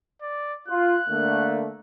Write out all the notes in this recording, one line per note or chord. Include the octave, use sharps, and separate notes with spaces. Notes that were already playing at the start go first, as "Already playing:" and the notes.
D5
F4 F#6
D3 A3 A#3